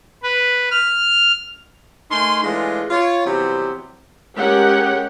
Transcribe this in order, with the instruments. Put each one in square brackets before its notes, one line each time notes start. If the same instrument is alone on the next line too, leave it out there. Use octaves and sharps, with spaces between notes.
[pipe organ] B4
F6
[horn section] A3 D#4 A#4 G#5 C6
E3 G#3 A3 C#4 D4 F4
F4 C#5
C3 E3 F#3 G3 B3 C4
[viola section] G#3 C#4 G4 A#4 F#5 G5